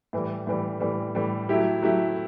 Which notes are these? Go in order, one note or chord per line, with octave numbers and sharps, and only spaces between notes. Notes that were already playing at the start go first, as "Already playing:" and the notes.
A2 E3 G3
A2 E3 G3
A2 E3 G3
A2 E3 G3
F#3 A3 E4 G4
F#3 A3 E4 G4